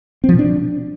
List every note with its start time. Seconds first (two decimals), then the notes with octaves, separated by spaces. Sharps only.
0.24 C4
0.29 F3
0.34 B2
0.39 D4